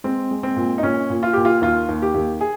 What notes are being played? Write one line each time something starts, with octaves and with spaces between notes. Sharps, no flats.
G#3 C4
G#3
C4
A#2
D#4
A#2 C#4
A#2
F4
A#2 G4
F4
D#2 F4
D#2
G4
D#2
G#4